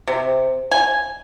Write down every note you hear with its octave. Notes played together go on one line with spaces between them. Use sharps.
C3
G#5